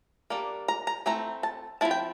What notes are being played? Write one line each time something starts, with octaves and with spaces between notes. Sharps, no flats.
G3 A#3 D4
A#5
A#5
E3 A3 C4 A#5
A5
F3 C4 E4 A5
G5